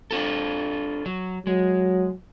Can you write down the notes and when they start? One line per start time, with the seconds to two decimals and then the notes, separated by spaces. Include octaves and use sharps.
0.11 D4 F4 A4
1.06 F#3
1.47 F#3 G#3